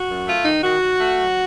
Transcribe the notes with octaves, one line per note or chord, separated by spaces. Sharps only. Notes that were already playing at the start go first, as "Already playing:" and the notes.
Already playing: F#4
F#2
A3 F4
D#3 D#4
D#3 F#4
D#3
A3
F#3